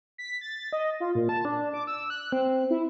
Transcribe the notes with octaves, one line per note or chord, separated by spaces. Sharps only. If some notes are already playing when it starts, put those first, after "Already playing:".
B6
A6
D#5
F4
A#2
A5
D4
D6
E6
F#6
C4
E4